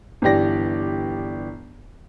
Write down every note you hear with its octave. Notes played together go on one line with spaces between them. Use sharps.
G1 E3 G4 D5 A#6